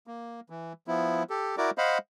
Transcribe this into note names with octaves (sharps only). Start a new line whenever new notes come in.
A#3
E3
F3 B3 E4
G4 A4
E4 F#4 A#4 D5 D6
C5 D#5 F5 F#5 B5